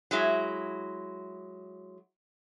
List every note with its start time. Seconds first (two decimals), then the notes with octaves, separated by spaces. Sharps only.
0.11 F#3 G#3 E4